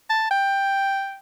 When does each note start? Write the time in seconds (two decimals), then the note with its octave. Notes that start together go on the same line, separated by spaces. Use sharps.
0.10 A5
0.31 G5